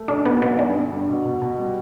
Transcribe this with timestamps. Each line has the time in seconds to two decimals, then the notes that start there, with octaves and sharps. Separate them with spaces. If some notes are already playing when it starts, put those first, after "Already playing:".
Already playing: A3
0.08 B1 D4
0.25 B2 B3
0.42 B1 B3
0.59 G2 D4
0.76 D3
0.92 G2
1.09 B2
1.26 B2
1.42 B2
1.59 G3